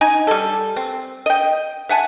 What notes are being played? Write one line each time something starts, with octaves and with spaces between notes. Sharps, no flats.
D#4 G#5
G3 A4
C4
D#5 G5
E5 F#5 G#5 A5